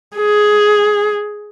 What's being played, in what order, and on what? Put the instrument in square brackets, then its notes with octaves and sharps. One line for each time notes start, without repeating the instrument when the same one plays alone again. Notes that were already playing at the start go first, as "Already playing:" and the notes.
[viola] G#4